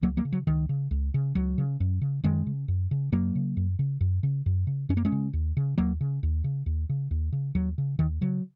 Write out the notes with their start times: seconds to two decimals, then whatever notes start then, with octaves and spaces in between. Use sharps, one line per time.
0.02 C#2 F#3 A#3
0.17 F#3 A#3
0.25 C#3
0.33 F#3
0.47 C#2 D#3
0.69 C#3
0.91 C#2
1.14 C#3
1.35 C#2 F#3
1.58 C#3
1.80 F#2
2.01 C#3
2.24 F#2 D#3 G#3
2.47 C#3
2.68 F#2
2.91 C#3
3.12 F#2 F#3 A#3
3.35 C#3
3.57 F#2
3.79 C#3
4.01 F#2
4.23 C#3
4.46 F#2
4.67 C#3
4.89 F#2 C#4
4.97 A#3
5.05 G#3 C#4
5.12 C#3
5.33 D#2
5.57 C#3
5.78 D#2 F#3 A#3
6.01 C#3
6.23 D#2
6.44 C#3
6.66 D#2
6.89 C#3
7.11 D#2
7.33 C#3
7.55 D#2 F#3
7.78 C#3
7.99 D#2 D#3
8.21 C#3 F#3